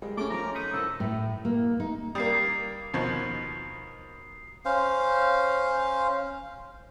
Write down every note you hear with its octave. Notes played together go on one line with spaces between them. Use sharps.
G3 G#3 G#4
A3 C#4 D6
D#3 F3 A#5
D#4 B5 C#6 D#6
C2 F#2 A4
A2
A#3
D#4
G3 A#3 D#6 C7
D#2 B2 F3
C#4 C5 F5